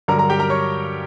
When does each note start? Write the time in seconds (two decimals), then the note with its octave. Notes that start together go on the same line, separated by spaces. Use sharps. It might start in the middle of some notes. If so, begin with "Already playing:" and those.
0.08 G2 D3 F#3 A#4 A#5
0.18 A#4 A#5
0.30 G4 G5
0.39 A#4 A#5
0.50 C#5 C#6